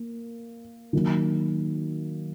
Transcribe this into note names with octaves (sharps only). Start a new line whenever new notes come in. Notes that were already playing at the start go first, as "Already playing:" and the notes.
Already playing: A#3
D#3 F#3 A#3